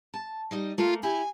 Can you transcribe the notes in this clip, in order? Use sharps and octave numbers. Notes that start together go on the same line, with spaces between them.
A5
G3 D#4 D#5
A3 A#3 F4
E4 G4 G#5